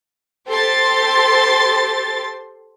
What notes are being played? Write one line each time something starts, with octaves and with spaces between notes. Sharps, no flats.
G4 A4 C5 C6 A6